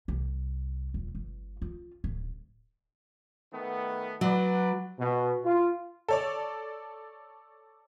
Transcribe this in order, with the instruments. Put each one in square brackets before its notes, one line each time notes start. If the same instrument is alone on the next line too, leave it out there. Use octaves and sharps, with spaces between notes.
[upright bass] C2
D#1
G1
F4
D1
[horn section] D#3 A3 B3
[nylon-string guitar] F#3 [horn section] F#4 B4 D5
[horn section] B2
F4
[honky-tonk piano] A4 C#5 D5